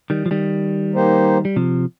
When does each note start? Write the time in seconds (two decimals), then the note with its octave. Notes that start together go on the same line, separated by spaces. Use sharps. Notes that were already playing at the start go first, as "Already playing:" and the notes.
0.10 D#3 G3
0.26 F3
0.31 D#3 G3
0.94 A#3 D#4 G4 C5
1.45 G3
1.56 C3 F3